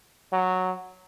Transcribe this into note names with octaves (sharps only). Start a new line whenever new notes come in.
F#3